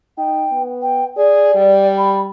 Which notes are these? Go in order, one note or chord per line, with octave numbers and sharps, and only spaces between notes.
D#4 G5
B3
G5
G#4 D5
G3
B5